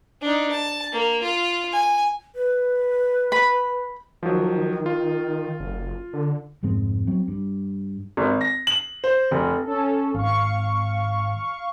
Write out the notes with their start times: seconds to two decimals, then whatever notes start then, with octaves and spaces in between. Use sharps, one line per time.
0.21 D4 D#4
0.51 A5
0.92 A#3
1.22 F4
1.73 G#5
2.35 B4
3.32 B5
4.23 D#3 F3 F#3
4.86 F4
5.60 F#1
6.13 D3
6.63 F1 G#2 G#3 C4
7.07 F#3 C4
7.28 G2
8.17 G#1
8.41 A#6
8.67 F#7
9.04 C5
9.31 F1
9.63 C#4 A4
10.14 G#1 F5 C#6